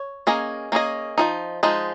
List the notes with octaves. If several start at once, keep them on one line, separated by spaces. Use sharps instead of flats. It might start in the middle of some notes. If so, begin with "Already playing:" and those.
Already playing: C#5
A#3 C#4 G#4 D#5
A#3 C#4 G#4 D#5
F3 G#3 D#4
F3 G#3 D#4